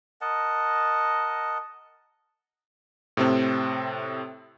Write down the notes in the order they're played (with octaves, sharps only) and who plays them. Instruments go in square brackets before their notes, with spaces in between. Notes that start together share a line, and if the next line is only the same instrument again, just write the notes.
[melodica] A#4 D#5 F#5 A5
[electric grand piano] A2 C3 C4